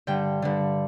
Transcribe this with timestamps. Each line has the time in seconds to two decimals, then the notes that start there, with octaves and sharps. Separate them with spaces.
0.07 G2 D3 G5
0.42 G2 D3